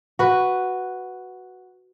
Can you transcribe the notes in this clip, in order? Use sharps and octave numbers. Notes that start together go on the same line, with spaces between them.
F#4 B4